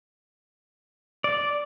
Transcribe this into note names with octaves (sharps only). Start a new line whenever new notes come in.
D5